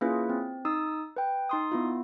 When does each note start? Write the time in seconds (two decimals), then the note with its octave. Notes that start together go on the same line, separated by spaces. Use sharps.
0.01 A#3 C#4 E4 F4 G#4 B4
0.29 C4
0.65 D#4 D#6 E6
1.16 B4 G5
1.49 D#4 C6 D#6
1.72 B3 E4 F4